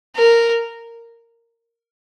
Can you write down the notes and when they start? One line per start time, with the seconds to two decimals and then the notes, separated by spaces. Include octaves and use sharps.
0.15 A#4